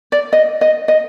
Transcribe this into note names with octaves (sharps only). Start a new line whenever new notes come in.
D5
D#5
D#5
D#5